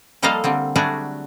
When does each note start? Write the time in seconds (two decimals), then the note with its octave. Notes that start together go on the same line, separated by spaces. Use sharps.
0.22 F3 G3 A#3 A4 D#5 F5
0.44 D3 G3 C4
0.76 F#3 G3 A3 D4 F#4 G#4